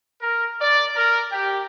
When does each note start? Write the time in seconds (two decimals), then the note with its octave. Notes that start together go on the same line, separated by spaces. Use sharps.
0.20 A#4
0.59 D5
0.95 A#4
1.31 G4